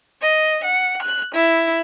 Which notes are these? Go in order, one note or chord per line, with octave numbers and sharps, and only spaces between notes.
D#5
F#5
F#6
E4